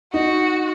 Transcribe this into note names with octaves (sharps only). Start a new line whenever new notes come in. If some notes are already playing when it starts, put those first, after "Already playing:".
D#4 F#4